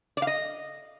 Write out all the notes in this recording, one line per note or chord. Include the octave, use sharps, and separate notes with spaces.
D5
F5
D#5